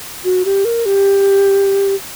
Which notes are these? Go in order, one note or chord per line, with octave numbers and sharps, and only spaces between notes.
F#4
G4
A#4
G4